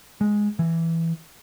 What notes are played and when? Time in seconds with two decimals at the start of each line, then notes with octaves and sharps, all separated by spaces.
0.21 G#3
0.59 E3